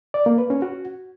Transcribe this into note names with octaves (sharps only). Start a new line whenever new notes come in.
D5
A#3
B4
C#4
F#4